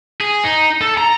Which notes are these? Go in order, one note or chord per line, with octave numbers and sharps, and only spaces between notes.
G#4
D#4
A4
A#5